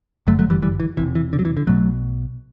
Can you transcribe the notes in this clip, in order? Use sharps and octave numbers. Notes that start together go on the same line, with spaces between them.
G1 F#2 D3 F#3 A3
F#3 A3
E3 G3
E3 G3
E3
E1 D2 C3 E3
E3
D3
F#3
E3
D3
B1 B2 F#3 A3